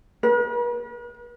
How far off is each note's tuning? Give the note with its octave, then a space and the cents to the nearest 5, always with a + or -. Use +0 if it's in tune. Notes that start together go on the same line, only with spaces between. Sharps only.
B4 -45